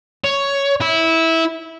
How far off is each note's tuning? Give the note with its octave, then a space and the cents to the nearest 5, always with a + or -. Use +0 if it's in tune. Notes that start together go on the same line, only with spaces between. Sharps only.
C#5 +5
E4 -15